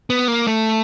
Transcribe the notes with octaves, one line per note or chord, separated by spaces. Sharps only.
B3
A#3
A3